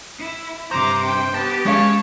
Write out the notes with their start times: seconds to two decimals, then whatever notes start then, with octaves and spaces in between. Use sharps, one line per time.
0.19 E4
0.71 G2 C3 C5 A#5 D6
1.06 G5
1.34 B3 G4 A5
1.65 G#3 C#4 C#5 F5